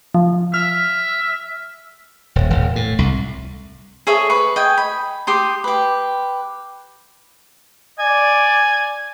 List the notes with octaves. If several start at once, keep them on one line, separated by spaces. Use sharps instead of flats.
F3
E5 F6
D#1
D#1
A2
C2
G#4 A4 C#5 E5
B4 C#6
D#5 G5 G#5
B5
G4 C6 D#6
G4 B4
D5 G#5